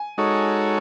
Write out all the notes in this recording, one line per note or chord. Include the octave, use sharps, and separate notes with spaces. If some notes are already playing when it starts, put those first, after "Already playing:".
Already playing: G#5
G#3 D#4 F#4 A4 C#5